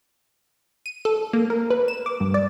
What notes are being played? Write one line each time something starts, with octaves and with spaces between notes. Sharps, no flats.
D#7
A4
A#3
A#4
B4
E7
D6
G2
D5